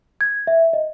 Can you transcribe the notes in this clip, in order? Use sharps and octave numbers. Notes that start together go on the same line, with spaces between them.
G#6
E5
D#5